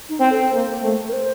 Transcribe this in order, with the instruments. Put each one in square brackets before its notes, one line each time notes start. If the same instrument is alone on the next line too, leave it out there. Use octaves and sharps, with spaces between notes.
[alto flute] D#4
[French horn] C4
[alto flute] A4
[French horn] A#3 [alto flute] C5
[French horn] A3
[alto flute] A#4
C5